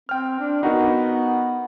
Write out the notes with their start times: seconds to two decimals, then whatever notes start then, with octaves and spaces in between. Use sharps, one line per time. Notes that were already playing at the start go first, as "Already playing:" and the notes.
0.09 C4 G5 F6
0.40 D4
0.63 B3 D#4 F#4 A#4